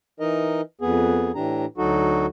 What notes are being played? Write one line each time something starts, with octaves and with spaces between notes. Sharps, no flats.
E3 D#4 A#4 D#5
F2 B3 G#4
A2 E3 D4 G4 A#5
D2 F#3 D#4 F#4 A4